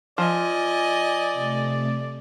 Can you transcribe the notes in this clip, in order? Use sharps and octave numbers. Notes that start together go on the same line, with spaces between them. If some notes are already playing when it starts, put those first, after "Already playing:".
F3 D5 D#5 G#5
C3 A3